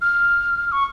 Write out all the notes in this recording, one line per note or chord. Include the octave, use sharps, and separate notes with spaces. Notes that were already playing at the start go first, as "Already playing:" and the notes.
F6
C#6